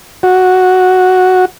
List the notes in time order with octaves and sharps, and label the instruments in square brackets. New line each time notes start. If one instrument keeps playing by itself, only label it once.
[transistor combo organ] F#4